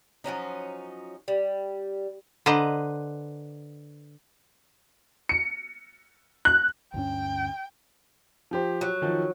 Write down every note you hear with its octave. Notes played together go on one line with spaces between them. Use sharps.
F3 F#3 C#4 D#4
G3
D3 B4 C5 D#5 A#5
C#7
F#6
D2 G2 C#4 G5
F3 G4 C5
F#3
D#3 F3